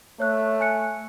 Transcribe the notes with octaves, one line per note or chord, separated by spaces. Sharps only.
A3 C#5 F#6
G#5 F#6 C#7